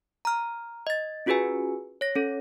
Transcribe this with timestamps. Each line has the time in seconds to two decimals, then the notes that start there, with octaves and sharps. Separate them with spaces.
0.25 A#5 F6
0.87 D#5 A6
1.26 C#4 F4 F#4 G#4 B4 G#5
2.01 C#5 A#6
2.15 C#4 A4